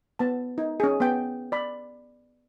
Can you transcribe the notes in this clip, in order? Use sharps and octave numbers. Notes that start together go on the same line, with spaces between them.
B3 A5
D#4
C#4 G#4
B3 G5
D5 B5